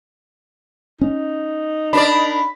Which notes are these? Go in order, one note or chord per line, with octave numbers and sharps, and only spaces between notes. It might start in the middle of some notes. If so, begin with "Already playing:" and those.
C#4 D#4
D4 A#4 D5 B5